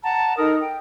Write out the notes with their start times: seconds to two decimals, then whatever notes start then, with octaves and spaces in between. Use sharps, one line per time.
0.03 F#5 A5 A#5
0.37 D#4 A4 A#4 D#6
0.61 G5